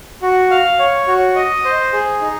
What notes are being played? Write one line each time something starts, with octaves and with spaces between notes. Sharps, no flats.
F#4
F5
C#5
F#4
D#5
C5
G#4
D#4